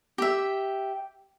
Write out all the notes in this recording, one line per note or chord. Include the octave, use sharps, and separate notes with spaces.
G4 E5